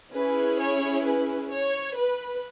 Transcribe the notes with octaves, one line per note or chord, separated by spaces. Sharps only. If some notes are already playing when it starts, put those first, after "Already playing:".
C#4 E4 G#4 B4
C#5
B4
C#5
B4